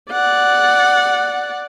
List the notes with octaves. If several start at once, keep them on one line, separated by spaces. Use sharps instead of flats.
D5 F#5